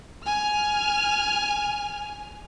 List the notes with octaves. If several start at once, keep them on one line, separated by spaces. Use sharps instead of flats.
G#5 F6